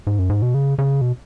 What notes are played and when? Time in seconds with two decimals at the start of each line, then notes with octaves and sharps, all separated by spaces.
0.07 G#2
0.19 F#2
0.30 G#2
0.42 B2
0.54 C#3
0.78 C#3
1.01 B2